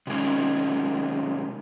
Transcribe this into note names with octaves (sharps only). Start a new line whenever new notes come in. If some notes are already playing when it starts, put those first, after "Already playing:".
C3 D#3 G#3 C#4